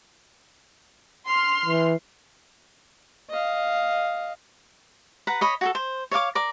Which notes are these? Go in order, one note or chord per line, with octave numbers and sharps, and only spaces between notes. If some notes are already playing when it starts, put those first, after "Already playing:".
C6 F6
E3
D#5 F5
B4 F#5 A#5
C#5 D#5 B5
F#4 G#4 A4
C5
C#5 D5 F5 D6
A#4 D5 D6